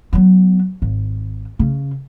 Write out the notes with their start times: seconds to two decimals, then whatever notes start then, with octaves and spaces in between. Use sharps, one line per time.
0.13 F#3 B3
0.82 G#1
1.59 C#3